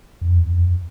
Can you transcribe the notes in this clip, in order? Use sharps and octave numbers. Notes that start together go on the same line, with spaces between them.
F2
E2
F2